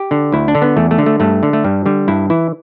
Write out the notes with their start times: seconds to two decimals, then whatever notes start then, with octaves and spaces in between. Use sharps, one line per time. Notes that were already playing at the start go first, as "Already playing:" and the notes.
Already playing: G4
0.11 D3
0.32 D2 E4
0.48 D4
0.55 D3
0.62 B3
0.77 E2 A3
0.91 A3
0.98 D3
1.06 A3
1.20 G2 A3
1.43 D3
1.53 A3
1.64 G2 G3
1.86 D3 G3
2.08 G2 E4
2.30 E3 E4